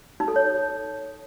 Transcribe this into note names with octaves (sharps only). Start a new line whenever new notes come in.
D#4
A4
C#5